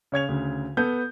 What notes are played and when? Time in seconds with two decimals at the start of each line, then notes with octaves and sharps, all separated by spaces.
0.12 C#3 C#5 G#6 F7
0.29 D2 C#3
0.77 B3 A4 G6